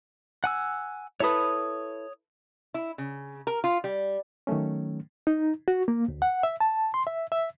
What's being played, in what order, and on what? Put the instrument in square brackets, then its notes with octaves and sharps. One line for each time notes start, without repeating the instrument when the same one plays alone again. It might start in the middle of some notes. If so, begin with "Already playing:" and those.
[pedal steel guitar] F#5 G#5 E6
[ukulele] E4 A4 B4 [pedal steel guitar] C#5 D#6
[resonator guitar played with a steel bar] E4
C#3
A#4
F4
G3
[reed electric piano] D#3 F#3 A3 C#4
D#4
F#4
A#3
D2
F#5
E5
A5
C6
E5
E5